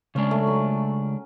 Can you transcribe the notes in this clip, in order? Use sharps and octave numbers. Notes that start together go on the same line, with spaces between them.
C#3 G#3 C#4 D4
A3
F#3